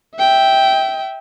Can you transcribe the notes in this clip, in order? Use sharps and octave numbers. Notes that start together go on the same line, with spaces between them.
E5 G5